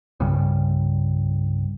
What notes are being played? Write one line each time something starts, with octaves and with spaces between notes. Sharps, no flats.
C2 G2 C#3 G3